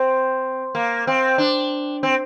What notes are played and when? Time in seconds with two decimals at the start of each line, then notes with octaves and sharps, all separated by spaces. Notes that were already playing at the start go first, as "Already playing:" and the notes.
Already playing: C4
0.75 A#3
1.07 C4
1.38 D4
2.03 C4